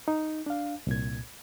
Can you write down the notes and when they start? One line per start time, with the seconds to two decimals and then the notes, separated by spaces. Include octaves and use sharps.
0.08 D#4
0.46 D4 F5
0.87 C2 A#2 G#6